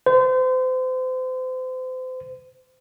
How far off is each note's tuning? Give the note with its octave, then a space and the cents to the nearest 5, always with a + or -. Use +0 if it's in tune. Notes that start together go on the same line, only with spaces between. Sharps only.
C5 -35